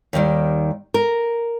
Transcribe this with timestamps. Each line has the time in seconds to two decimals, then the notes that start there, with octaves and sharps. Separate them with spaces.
0.13 D#2 D#3 G3
0.94 A#4